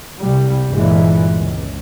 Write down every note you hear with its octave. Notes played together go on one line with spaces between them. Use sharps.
C2 G3
G1 G2 A#2 E3 G#3
C#2